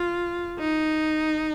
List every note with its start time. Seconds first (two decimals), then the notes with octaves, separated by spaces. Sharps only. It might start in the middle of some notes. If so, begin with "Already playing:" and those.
Already playing: F4
0.59 D#4